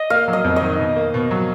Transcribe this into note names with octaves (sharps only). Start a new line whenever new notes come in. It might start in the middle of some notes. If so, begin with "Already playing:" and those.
Already playing: D#5
A#3 F5
F#3
D#5
F2
D#5
D#3
B2
A#3
B2
F#3